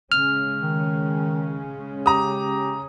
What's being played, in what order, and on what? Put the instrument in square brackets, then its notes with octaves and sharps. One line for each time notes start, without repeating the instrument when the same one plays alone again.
[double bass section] C#3 G#3 C#4 [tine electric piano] F6
[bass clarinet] D#3
[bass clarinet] G4 [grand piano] A#5 D#6